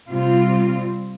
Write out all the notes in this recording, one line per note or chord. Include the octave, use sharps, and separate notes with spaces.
C3 G3 C4 F4